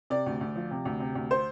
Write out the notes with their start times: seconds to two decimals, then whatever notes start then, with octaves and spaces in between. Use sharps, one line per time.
0.10 C3 D5
0.26 D2
0.41 D2
0.56 F3
0.71 C3
0.85 D2
1.00 C3
1.15 D2
1.31 C5